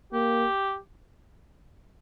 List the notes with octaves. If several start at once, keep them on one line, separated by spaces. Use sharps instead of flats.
A#3 G4